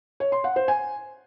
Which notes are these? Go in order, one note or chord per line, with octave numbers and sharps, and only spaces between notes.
C#5
C6
F#5
C5
G#5